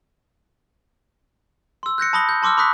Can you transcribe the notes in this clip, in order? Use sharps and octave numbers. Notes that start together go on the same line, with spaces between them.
C6 E6
F#6 G6 A#6 C#7
A5 B5 D#6 A#6 G7
G6
A5 C6 D6 E6 F6
B5 C#6 D#6 F#6 B6